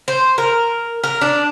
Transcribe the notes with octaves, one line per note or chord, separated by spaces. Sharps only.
C5
A#4
A#4
D4